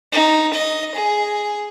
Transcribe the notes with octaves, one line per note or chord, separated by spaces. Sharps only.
D#4
D#5
G#4